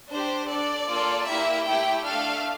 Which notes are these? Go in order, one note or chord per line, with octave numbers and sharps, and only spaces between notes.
D4 G4 C5
D4 A4 D5
A#3 F4 A4
A#3 E4 G4 E5
A3 E4 G4 G5
A3 D4 A4 F5